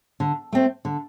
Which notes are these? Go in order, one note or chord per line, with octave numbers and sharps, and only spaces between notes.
D3
A3 C4
D3